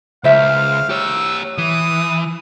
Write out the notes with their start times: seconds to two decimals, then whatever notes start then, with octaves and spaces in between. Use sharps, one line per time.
0.24 C#2 C5 E5 F5
0.89 G4 C#5 E6
1.58 E3 D#6